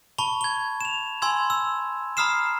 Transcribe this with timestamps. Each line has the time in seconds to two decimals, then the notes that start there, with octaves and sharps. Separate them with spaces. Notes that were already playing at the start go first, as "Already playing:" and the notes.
0.18 A5 B5 C#6 G7
0.41 G#6 G7
0.81 E7 F7
1.22 G#5 B5 C6 E6 G#6
1.50 E6
2.17 A#5 B5 D#6 F6 C7 E7